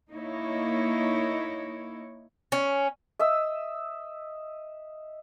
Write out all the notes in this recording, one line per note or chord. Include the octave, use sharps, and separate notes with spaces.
A#3 D#4 E4 C#5
C#4
D#5 E5 E6